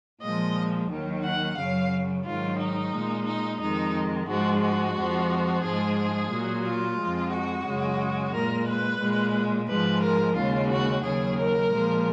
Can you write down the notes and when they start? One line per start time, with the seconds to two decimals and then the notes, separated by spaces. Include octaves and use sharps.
0.24 A#2 F3 G#3 D#5
0.91 D#2 D#3 F#3
1.24 F#5
1.58 F#2 C#3 F#3 F5
2.26 G#2 D#3 F#3 F4
2.60 D#4
2.93 A#2 G#3
3.27 D#4
3.60 F2 D#3 G#3 D#4
4.28 G#2 F3 G#3 F#4
4.62 F#4
4.95 F2 F3 G#3
5.64 G#2 F3 G#3 G#4
6.31 A#2 F#3
6.65 F4
6.98 F2 F3 G#3
7.33 F#4
7.66 F#2 C#3 G#3
8.34 A#2 G#3 A#4
8.67 B4
9.01 A#2 G#3
9.68 G#2 F3 G#3 B4
10.02 A#4
10.36 D#2 C#3 G#3 F4
10.70 F#4
11.04 D#2 C#3 F#3 G#4
11.37 A#4
11.72 A#2 F3 G#3